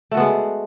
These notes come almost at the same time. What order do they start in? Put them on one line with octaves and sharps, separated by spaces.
A3 F#4 B3 G#3